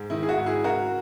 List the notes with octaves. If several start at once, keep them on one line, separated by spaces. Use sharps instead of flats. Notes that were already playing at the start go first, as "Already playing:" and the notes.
Already playing: G#2
D#3 E4
G#4
F#4
G#2
E4 G#4
C#3 F#4 A#4